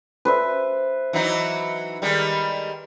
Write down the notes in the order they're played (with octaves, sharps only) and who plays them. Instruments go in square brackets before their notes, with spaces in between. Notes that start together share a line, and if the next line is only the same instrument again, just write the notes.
[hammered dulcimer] B4 C5 E5
[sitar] E3 F#3 D#4
D#3 G3 G#3